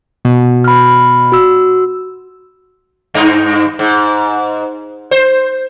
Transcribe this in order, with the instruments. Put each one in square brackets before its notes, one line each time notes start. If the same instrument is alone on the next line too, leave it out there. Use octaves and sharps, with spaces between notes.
[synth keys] B2
[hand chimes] B5 F6
F#4 E6
[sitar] G2 D#4
G#2
C5